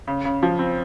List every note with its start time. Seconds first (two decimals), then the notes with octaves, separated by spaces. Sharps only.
0.07 C#3
0.25 C#3
0.43 F3
0.59 C4